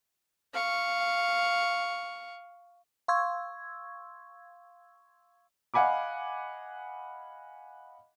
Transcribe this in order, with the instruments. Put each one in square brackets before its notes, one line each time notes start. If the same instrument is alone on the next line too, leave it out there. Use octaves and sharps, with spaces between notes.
[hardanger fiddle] F5 C#6
[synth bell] F5 C6 C#6 E6 G#6
[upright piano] D#5 F5 F#5 G#5 B5 D6